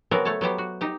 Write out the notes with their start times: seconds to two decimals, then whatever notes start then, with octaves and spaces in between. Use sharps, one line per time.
0.11 C#3 F#3 B3 C4 A#4 D5
0.25 A3 C#5 A5
0.41 F#3 B3 G4 C5
0.58 F#4
0.81 D#4 G4